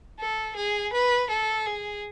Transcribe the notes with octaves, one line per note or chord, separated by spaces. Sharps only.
A4
G#4
B4
A4
G#4